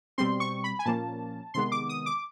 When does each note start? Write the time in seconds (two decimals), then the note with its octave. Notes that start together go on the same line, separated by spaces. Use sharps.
0.18 B2 G3 C4 C6
0.40 C#6
0.64 B5
0.79 G#5
0.86 A#2 F3 A#3 C#4 A5
1.54 C3 D#3 G#3 B3 C6
1.72 D6
1.89 D#6
2.06 D6